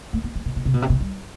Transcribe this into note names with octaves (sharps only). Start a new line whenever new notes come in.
A3
B3
A3
B2
B2
C3
B2
C3
B2
G3